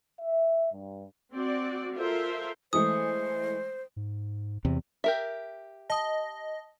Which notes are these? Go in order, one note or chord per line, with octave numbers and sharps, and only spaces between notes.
E5
G2
C4 F#4 D5
F4 A4 A#4 C5 E5
E3 G#3 A3 C5 D#6
G#2
E2 C3
G4 A#4 E5
D#5 A5 D#6